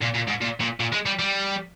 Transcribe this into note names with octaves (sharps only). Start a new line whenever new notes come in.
A#2
A#2
G#2
A#2
A#2
A#2
G#3
G3
G3